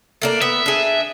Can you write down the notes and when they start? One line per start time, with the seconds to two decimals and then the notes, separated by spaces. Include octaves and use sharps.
0.22 A3 A#3 D4
0.42 B3 E5
0.66 D4 G#4